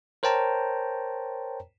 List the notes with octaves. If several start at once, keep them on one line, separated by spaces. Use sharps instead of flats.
A#4 C5 C#5 G5 A5 A#5